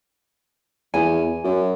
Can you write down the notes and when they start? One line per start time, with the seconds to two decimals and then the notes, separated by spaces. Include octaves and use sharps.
0.94 E2 G#5
1.44 F#2